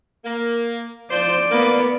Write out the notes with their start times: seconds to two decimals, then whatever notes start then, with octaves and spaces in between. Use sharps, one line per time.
0.24 A#3
1.11 F3 C5 D5
1.51 A#3 B3